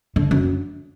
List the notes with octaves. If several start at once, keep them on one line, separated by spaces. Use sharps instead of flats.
D3
F#2